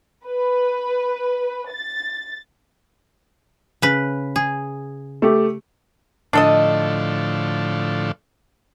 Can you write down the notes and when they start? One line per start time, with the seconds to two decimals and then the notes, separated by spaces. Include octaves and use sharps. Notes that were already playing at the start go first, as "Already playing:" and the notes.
0.27 B4
1.73 A6
3.82 C#3 B4
4.36 G#4
5.22 A3 G4
6.33 A2 D3 F3 D4 A4 D#5